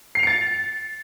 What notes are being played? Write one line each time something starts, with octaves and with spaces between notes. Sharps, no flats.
A6 C7 C#7 F7